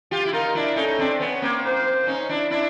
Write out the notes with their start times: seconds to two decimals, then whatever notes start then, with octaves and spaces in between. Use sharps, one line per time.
0.11 F4 G4
0.25 E4
0.33 D#4 F4 A#4
0.55 D4 E4
0.76 C#4 D#4 A4
0.99 C4 D4
1.20 B3 C#4
1.42 A#3 C4
1.64 C5
2.07 C#4 D#4
2.29 D4 E4
2.50 D4 E4